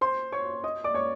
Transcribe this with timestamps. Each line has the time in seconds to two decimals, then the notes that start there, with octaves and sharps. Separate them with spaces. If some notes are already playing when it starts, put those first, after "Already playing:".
0.01 C5 C6
0.32 C#5 C#6
0.64 D#5 D#6
0.84 D5 D6
0.94 C#5 C#6